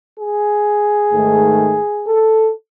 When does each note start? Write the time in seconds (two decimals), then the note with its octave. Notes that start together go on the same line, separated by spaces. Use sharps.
0.18 G#4
1.13 G#2 D#3 A3
2.07 A4